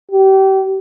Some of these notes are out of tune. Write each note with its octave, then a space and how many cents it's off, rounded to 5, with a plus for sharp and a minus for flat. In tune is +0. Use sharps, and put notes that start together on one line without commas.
G4 -30